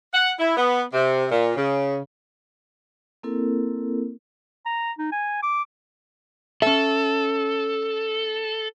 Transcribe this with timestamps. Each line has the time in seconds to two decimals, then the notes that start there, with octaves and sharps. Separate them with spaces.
0.14 F#5
0.39 E4
0.57 B3
0.93 C3
1.31 A#2
1.56 C#3
3.23 A#3 C4 E4 A4 A#4
4.66 A#5
4.98 D#4
5.12 G#5
5.43 D6
6.62 C#4 A4 E5